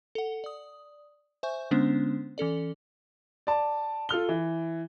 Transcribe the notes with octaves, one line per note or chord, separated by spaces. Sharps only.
A4 F#5
D5 D#6
C5 E5 G#5 C#6 G6
D3 G#3 B3 C#4 D4 C5
E3 C#4 A4 D5
D5 A5
F4 A4 F6 G7
E3